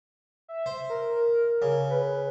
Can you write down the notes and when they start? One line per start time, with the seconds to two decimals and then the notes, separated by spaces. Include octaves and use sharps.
0.48 E5
0.66 C5
0.89 A#4
1.62 C#3
1.90 B4